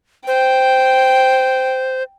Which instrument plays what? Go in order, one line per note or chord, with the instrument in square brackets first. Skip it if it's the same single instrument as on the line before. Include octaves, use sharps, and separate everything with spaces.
[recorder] C5 [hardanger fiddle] G5